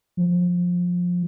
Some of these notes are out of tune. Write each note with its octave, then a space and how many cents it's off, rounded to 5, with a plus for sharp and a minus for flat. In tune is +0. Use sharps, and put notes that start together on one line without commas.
F3 +20